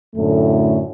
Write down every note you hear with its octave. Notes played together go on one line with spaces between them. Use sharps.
F#2 A2 D3 A3